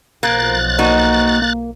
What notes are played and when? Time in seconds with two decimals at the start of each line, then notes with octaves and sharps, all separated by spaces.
0.23 B1 F3 A#3 F#6 A6
0.79 A#3 D#4 F#4
1.42 A#3